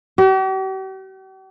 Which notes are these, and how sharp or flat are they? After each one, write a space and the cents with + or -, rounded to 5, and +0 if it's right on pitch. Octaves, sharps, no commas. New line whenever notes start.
G4 -45